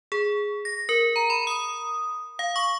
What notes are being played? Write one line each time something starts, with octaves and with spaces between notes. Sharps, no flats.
G#4
A#6
A#4
A#5
B5
D#6
F5
C#6